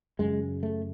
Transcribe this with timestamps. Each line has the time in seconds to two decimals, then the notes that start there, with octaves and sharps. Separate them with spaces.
0.19 F#2 C#3 G#3
0.63 A3